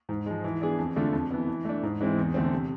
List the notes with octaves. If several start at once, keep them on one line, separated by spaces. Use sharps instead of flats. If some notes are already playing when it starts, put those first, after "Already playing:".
G#2
F3 G#3
E3
B3 D4 G#4
F2
D3 A3 D4 F4
F2
E3 B3
E3
A3 D4
G#2
E3 G#3 C4
E2
D3 A3 C4
C3